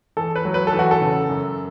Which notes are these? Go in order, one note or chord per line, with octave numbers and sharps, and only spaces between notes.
E2 A4
B4
F#3
B4
A4
E2
F#4
A4
C#3
F#2